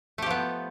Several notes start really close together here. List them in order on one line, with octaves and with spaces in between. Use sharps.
A3 G4 F3 B3